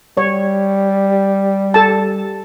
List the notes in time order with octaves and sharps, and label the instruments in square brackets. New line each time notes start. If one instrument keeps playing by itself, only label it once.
[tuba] G3 [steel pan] C#5
[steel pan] A4 A5